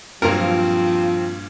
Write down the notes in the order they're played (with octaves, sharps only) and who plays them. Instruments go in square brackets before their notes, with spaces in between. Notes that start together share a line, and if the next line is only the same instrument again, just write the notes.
[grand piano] G2 A#2 F#3 [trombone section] F3 [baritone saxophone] C4 [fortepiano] A#4